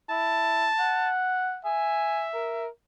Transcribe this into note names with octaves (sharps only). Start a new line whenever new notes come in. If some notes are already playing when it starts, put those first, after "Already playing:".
E4 A5
F#5
E5 G#5
A#4